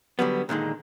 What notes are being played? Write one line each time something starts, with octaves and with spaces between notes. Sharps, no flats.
D3 F#3 G3 B3
A#2 D3 D#3 G#3